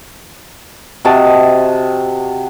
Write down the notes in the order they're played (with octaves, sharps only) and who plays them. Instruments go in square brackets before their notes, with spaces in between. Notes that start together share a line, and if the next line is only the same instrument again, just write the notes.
[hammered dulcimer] C3 F#4 D#5 A5